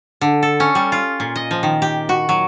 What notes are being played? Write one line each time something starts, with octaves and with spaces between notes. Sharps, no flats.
D3
A4
C#4
G3
F4
A#2
D#5
F3
D#3
G4
F#4
F#3